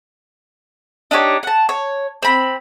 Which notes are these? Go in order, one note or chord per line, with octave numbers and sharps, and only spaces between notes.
D4 D#4 G4 C#5
F#5 A5
C#5
C4 B5